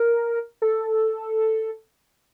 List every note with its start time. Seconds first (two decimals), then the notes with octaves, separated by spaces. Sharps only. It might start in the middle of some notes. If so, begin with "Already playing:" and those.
Already playing: A#4
0.62 A4